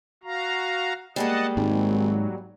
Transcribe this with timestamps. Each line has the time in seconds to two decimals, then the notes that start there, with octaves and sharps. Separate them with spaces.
0.23 F#4 F5 A#5
1.16 G3 G#3 A#3 D#5 F#5 A5
1.57 G#1 G#2 F#3